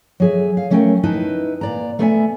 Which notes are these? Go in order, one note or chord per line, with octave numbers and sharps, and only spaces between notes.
F#3 G#4 E5
F5
F#3 A3 C#4 A#4 E5 G5
D#4 E4 B4 A5
A#2 D5 A#5
A3 B3 C5 D#5 E5 G#5